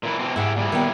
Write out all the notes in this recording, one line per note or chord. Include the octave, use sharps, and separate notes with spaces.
A#2 E3 E4
B2 E3 C4
G#2 E4 G4 F#5
A#2 G3 E4
D#3 B3 G5